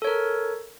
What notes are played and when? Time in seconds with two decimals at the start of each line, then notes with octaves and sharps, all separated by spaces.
0.02 A4
0.04 C#5
0.07 A#4